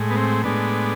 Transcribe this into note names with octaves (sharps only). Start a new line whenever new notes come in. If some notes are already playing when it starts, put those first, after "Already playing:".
Already playing: A2 G#3
B3
C4
A2 G#3 B3 D4